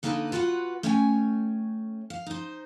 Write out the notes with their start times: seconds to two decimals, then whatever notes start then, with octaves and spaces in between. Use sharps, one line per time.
0.03 D3 A#3 D#4 G4 A4 B4
0.32 F4 F#4 B4 D5 F#5
0.83 A3 C#4 C#5 G5 G#5
2.10 F5
2.27 D#4 C5